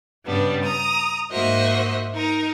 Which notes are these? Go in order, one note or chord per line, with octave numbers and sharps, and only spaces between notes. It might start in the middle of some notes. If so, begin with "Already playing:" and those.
G2 C#3 G3 B3 D4
A#5 D#6
G#2 A#3 F#4 C5 D#5 E5
D#4 A#4 A#5